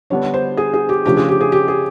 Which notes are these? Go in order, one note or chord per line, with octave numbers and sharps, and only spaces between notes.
D3 G3 B3 D4 C#5
C5
G#4
G#4
G4
C#3 F3 A3 D4 G4
G#4
G4
G#4
G4
G#4